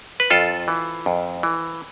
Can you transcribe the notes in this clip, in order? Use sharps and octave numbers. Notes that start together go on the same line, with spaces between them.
B4
F2 F4 A4
E3
F2
E3